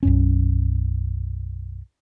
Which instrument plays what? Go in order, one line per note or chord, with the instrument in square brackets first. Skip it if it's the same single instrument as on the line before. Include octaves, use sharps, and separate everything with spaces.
[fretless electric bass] B1 F#2 C#4